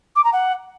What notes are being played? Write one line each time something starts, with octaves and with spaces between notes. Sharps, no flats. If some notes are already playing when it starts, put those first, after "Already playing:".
D6
A#5
F#5